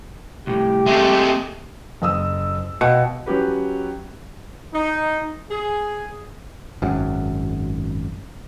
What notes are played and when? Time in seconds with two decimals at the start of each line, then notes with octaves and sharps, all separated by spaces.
0.47 C2 A2 G4
0.86 G#3 A3 C4 E5
2.02 F#1 D#6 E6
2.81 B2 F5 G5 C#7
3.26 F#3 C#4 G4 B4
4.74 D#4
5.49 G#4
6.82 G#1 F#2